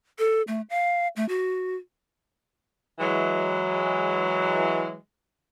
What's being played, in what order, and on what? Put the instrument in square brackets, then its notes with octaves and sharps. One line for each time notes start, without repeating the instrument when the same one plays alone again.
[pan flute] A4
A3
F5
A3
F#4
[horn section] E3 F#3 G#3